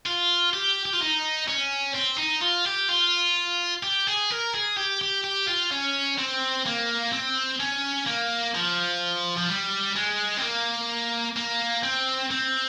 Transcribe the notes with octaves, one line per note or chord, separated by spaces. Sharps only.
F4
G4
G4
F4
D#4
C#4
C4
D#4
F4
G4
F4
G4
G#4
A#4
G#4
G4
G4
G4
F4
C#4
C4
A#3
C4
C#4
A#3
F3
F3
G3
G#3
C4
A#3
A#3
C4
C4